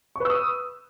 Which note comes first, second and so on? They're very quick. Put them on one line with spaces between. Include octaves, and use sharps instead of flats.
C#6 B4 E6 D#6